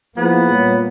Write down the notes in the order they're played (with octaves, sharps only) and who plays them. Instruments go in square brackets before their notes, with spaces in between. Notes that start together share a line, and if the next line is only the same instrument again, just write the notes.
[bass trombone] F3 [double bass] A#3 [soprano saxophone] B3 [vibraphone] E4 G#4
[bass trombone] A#2 [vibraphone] G3 C#5